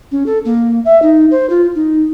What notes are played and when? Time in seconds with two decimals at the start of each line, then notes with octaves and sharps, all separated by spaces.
0.12 C#4
0.26 A4
0.45 A#3
0.85 E5
1.02 D#4
1.31 C5
1.50 F4
1.75 D#4